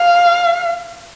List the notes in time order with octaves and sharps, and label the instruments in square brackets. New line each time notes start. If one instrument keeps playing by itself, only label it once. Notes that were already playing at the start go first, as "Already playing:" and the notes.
Already playing: [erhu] F5